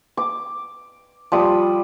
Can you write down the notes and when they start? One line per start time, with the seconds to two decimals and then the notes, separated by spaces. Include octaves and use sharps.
0.17 D6
1.32 F3 G3 B5 D#6